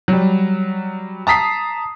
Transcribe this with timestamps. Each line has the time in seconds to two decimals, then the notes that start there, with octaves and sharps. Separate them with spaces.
0.08 F#3 G3
1.27 A5 A#5 D#6 B6 C7